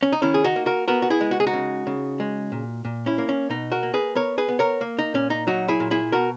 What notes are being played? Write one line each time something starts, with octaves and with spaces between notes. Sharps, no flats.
C#4
D#4
D#3 C#4 E4
G#4
D#4 F#4
A#3
F#4 A#4
B3 F#4 A#4
F#4
E4 G#4
G#3
F#4
G#4
D#4 F#4
C#3
C#3
G#3
A#2
A#2
C#4 E4
A#3
C#4
B2 D#4
F#4 A#4
A#3
G#4 B4
B3 A#4 C#5
G#4 B4
B3
A#4 C#5
A#3
D#4
A#2 C#4
D#4
F#3 D#4 F#4
E4 G#4
A#2
E4 G#4
B2 F#4 A#4